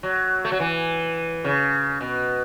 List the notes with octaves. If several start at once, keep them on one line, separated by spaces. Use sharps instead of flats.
F#3
A3
F#3
E3
C#3
B2